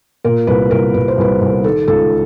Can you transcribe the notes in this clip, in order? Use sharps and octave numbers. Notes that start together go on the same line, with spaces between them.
A#2 A#4
C2 B4
C2 A#4
C2 B4
C5
C2 B4
C2
D#3 A4
C#2 A4